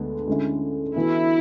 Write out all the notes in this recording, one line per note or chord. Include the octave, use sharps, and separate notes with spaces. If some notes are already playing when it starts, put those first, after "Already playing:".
Already playing: D2 D3 G#3 B3
D3 G#3 C#4 E4
E3 B3 E4 F#4 A4